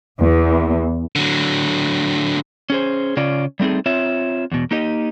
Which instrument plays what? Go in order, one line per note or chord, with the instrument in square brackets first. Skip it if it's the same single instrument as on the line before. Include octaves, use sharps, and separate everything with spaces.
[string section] E2
[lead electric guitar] D3 F#3
[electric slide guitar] C#4 G#4 C5
C#3 C#4 F4 D5
G3 A3 C4 D#4 G#4
C4 F4 C#5 E5
E2 B2
A#3 D#4 G4 D#5